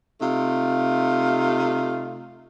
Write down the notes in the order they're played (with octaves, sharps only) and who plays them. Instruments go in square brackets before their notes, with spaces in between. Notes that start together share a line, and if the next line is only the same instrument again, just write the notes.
[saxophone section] C3 A3 D#4 F4